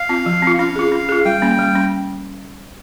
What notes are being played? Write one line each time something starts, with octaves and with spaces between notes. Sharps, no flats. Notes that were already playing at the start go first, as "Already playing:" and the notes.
Already playing: F5
C4 F4
F3
C4 F4
C#4 F5
F4 G#4
C#4
F4 G#4
G3 G5
A#3 C#4
G3
C#4